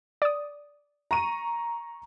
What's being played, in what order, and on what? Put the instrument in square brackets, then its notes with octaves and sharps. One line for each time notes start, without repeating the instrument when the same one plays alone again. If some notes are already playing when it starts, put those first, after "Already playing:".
[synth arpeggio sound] D5 D#6
[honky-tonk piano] A#5 C#6 D#7